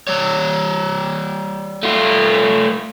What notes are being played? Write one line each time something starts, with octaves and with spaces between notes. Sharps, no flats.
G3 C#5
A3 F4